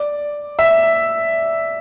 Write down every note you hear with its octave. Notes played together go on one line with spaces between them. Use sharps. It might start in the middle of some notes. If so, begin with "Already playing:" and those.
Already playing: D5
E5